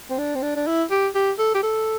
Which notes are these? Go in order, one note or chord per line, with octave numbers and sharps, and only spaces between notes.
C4
D4
C4
D4
D4
E4
G4
G4
A4
G4
A4